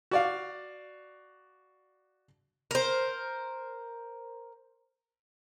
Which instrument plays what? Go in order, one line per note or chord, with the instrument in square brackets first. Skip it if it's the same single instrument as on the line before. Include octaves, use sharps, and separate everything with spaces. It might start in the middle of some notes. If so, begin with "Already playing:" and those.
[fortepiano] F#4 D5 F5
[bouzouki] A#4 C5